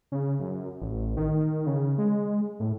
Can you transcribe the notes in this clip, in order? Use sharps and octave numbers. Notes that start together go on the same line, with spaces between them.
C#3
F#2
A1
D#3
C#3
G#3
A2